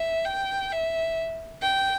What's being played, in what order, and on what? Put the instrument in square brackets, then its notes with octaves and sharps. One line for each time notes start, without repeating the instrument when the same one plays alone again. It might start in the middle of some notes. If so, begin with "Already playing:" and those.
Already playing: [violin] E5
G5
E5
G5